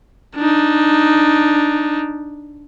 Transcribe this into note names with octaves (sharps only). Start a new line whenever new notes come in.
D4 D#4